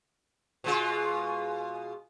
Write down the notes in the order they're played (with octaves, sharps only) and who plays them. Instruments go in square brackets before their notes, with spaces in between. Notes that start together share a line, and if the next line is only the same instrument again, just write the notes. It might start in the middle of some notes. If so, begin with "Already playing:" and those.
[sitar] B2 G#3 F4